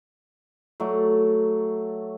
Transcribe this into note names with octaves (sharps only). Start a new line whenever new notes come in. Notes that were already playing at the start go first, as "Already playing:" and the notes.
F#3 A3 D5